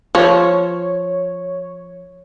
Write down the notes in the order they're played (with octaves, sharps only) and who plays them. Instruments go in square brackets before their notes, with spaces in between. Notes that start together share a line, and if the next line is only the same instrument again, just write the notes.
[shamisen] F3 [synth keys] C#5